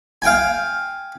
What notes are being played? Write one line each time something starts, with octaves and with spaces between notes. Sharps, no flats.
F5 G5 G#5